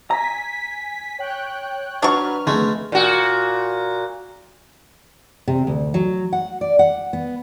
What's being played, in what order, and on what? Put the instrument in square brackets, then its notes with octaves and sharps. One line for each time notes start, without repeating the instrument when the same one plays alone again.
[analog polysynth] G#5 B6 [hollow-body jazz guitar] A#5
[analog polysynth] C#5 G5 F#6
[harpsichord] F#3 [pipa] D4 C#6 [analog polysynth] B4 F6
[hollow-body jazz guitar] F2 G#2 D3 [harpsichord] G#3 A3
[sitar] A#2 F#4
[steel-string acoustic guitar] C3
D2
F#3
F#5
D5
F#5
B3